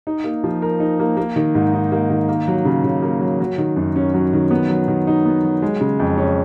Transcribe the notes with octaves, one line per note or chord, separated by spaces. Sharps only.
D#4
A#3
F3
A#4
D#4
A#3
A#3
D#3
G#2
D#4
A#3
D#3
A#3
F#3
C#3
C#3
A#3
F#3
F#3
D#3
F#2
C#4
F#3
D#3
B3
F#3
D#3
D#4
B3
F#3
G#3
C#3
F2
C#4